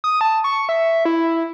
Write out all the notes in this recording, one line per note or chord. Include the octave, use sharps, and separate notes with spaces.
D#6
A5
C#6
E5
E4